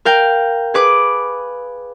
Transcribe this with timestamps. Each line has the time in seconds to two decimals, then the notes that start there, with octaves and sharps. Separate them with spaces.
0.05 A#4 F5 G5
0.74 G#4 B4 D6